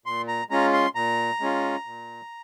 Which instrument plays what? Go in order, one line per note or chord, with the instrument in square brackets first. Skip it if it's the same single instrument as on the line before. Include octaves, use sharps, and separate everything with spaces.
[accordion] A#2 C6
A#5
G#3 C#4 F4 A#5
C6
A#2 A#5
G#3 C#4 F4
A#2